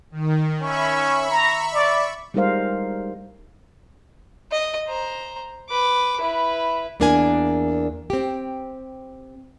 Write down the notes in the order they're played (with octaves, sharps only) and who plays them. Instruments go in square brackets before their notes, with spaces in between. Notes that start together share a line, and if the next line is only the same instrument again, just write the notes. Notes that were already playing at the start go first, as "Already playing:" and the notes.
[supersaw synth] D#3
[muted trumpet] C#4 [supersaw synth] E5 B5 C#6
[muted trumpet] A#5
D5
[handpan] G3 G#3 D#4 A#4 C5 F5
[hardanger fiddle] D#5
C5 A#5
B4 D6
E4 B4
[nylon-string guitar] E2 A#3 D4 A#4 D5 G#5
C4 G4